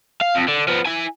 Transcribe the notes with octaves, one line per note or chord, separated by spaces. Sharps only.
F5
F2
D3
F3 B3
E4 G#5